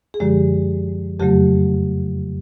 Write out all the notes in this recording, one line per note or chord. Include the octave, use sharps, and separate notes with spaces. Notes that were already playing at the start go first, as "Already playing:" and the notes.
G#4
F#2 D3 F3 G#3 G4
F2 C#3 F#3 A3 G4